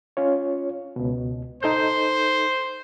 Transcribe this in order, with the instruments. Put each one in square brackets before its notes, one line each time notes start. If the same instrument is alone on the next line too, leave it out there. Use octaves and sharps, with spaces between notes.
[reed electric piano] C#4 F4 C#5
C#2 B2
[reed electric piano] D#4 A4 G6 [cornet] C5